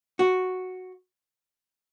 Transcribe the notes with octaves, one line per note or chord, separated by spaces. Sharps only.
F#4